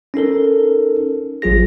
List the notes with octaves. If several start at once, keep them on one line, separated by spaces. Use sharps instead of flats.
C#4 D#4 A4 A#4
A1 F#3 F4 G#4 A#6